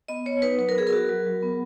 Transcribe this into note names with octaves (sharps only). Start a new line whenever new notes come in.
B3 D#5
B3 C#5
D#4 B4
F#3 B4
A#4
B3 G#4
A#4
F#4
F#3
F#3
B3